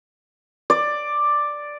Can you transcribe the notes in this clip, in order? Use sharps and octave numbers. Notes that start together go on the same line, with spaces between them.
D5